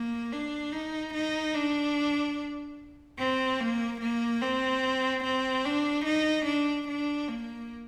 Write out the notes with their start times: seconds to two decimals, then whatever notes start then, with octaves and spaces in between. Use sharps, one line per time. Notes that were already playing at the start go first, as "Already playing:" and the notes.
Already playing: A#3
0.32 D4
0.73 D#4
1.14 D#4
1.55 D4
3.19 C4
3.60 A#3
4.01 A#3
4.42 C4
5.24 C4
5.65 D4
6.05 D#4
6.46 D4
6.88 D4
7.28 A#3